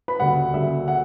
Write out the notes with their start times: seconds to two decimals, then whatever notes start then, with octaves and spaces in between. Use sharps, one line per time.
0.08 B4 B5
0.20 D2 C#3 G3 A#3 F#5
0.53 D2 C#3 G3 A#3 E5
0.88 C#3 F#5